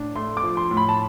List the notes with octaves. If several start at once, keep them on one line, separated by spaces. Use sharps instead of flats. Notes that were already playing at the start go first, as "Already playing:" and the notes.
Already playing: A2 D4
A3 C6
D6
F3
C6
A2
B5
A5